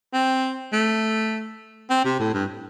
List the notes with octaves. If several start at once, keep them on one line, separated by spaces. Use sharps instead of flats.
C4
A3
C4
C3
A2
G2